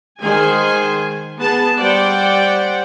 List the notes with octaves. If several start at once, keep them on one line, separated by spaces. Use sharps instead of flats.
D#3 G#3 G#4 C5 G#5 C6
B3 G#4 A5
G3 C5 D5 F#5 G5